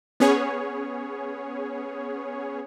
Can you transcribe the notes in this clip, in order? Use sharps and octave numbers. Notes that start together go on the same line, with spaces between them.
B3 C#4 G#4 C#5